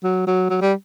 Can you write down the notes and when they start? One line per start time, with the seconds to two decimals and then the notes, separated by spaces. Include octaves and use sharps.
0.04 F#3
0.27 F#3
0.50 F#3
0.61 G3